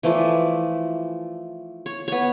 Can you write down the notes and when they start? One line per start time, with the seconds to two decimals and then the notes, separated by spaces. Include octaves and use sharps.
0.03 E3 F3 A3 D5
1.86 C#5
2.08 B3 C#5